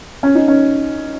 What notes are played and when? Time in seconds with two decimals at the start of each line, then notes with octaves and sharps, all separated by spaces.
0.23 C#4
0.35 D#4
0.48 C#4